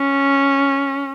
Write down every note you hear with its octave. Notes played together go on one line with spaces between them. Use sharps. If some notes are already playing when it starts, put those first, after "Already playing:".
Already playing: C#4